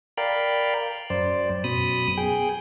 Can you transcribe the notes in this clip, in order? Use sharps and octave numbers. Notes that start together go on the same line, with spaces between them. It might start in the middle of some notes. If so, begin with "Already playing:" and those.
A#4 D5 F5 G5 B5
F#2 C5 D5
F#2 B2 B5 D#6
G#4 G5